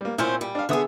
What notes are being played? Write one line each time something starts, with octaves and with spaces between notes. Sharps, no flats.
G3 A#3
A#2 C4 C#4 E4 C5 F6
G3
D4 F5
D3 B3 G#4 E5 D#6